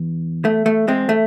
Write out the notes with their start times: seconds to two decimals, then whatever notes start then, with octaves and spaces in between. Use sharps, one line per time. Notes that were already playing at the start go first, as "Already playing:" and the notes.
Already playing: E2
0.45 A3
0.66 A3
0.88 G#3 C4
1.09 A3